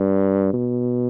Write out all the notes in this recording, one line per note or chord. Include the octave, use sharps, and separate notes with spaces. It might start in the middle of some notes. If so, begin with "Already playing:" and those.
Already playing: G2
B2